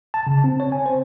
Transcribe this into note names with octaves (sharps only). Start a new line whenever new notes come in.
A5
C#3
C4
C#5
G#5
C5